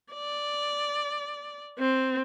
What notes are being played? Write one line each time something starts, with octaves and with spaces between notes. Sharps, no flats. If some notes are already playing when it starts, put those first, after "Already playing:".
D5
C4